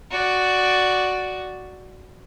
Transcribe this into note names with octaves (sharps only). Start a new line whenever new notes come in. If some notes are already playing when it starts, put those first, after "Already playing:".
F#4 D5